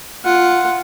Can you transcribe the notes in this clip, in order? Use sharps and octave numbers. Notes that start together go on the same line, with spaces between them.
F4 F#5